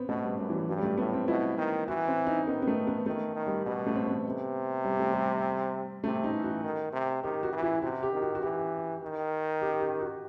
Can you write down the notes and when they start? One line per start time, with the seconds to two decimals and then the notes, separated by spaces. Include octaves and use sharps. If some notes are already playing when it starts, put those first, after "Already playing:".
Already playing: B3 C4
0.09 B2 A3
0.24 G3
0.38 F#2 G3
0.50 E3
0.53 F#3
0.68 G2 F#3
0.78 G3
0.83 A3
0.98 A2 B3
1.13 C4
1.28 B2 E4
1.58 D#3
1.88 E3 F#4
2.08 C4
2.27 D#4
2.46 D#3 B3
2.62 B3
2.67 A3
2.87 B3
3.06 D#3 A3
3.36 D#3
3.47 G3
3.66 B2 G3
3.87 A3
3.96 C4
4.06 B3
4.26 C3
4.85 G3
5.00 A3
5.13 G3
6.04 C3 A3
6.24 D#4
6.34 E3
6.43 F#4
6.64 D#3
6.93 C3
7.23 D#3 G4
7.43 F#4
7.53 E3
7.62 E4
7.82 C3 F#4
8.03 G4
8.13 D#3
8.22 F#4
8.35 F#4
8.42 E3 G4
9.02 D#3
9.62 G4
9.81 G4
10.01 F#4